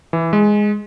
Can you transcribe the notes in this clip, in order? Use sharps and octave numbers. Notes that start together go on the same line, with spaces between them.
E3
G#3